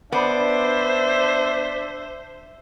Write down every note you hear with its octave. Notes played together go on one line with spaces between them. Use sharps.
B3 D4 C5 D5 E5